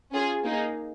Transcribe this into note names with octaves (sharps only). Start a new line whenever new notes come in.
C#4 F4 G#4
A#3 D#4 G#4